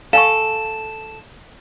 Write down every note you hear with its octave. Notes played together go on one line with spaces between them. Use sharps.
A4 F5 G#5 C#6 E7